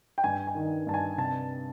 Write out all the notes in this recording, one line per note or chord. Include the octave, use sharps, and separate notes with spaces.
G5
G2 G#5
G#5
D#3
G2 A5
G#5
C3 A5